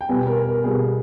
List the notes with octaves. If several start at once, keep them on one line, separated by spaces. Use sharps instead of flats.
G5
B2 G3 B3 G#5
A#4
A#4
B2 G3 B3 G#4